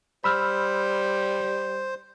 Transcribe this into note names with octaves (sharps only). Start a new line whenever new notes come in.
G3 C5 B5 E6 F6